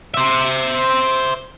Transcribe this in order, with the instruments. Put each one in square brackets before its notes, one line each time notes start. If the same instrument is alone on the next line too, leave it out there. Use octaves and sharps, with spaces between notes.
[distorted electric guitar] C5 E5